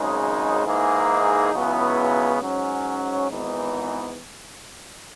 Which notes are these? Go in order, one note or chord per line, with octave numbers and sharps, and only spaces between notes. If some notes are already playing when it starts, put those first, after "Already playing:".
Already playing: G#1 F#2 C#3 G#3 D#4
G#2 E3 A#3 D#4 G#4
C#2 C#3 F#3 B3 E4
G#2 F#3 C#4
G#1 G#2 E3 B3 D#4